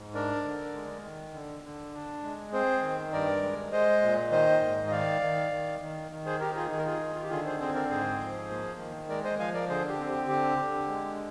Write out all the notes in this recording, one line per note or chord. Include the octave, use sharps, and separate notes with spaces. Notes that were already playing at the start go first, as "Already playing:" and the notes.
Already playing: G#2
D4 A#4 D5
D3
G#3
D#3
D3
D3
D4
G#3
C4 G#4 C5
D#3
G2 A#4 D5
G#3
G#3 C5 D#5
A#2
D#3 C5 D#5
G#2
D#5
D#3 D5 F5
D#3
D#3
D#3
D#3
G#4 C5
D#4 G4 A#4
F4 G#4
D#3 G#4
A#4
F4 G#4
D#3
F4
G4
D3 F4 G#4
G#4 C5
C4 G#4 C5
A#4 D5
G#2 G#4 C5
F3
A#3
D#3
G#3 A#4 D5
C5 D#5
F3 F5 G#5
A#4 D5
D3 G#4 C5
G4
C4
G4
D3 G4
D3
G#3